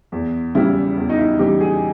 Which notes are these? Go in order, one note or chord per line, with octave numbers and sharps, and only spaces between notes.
E2
C#3 E3 G3 E4
E2
D#4
E4
C#3 E3 G3 G4
G#4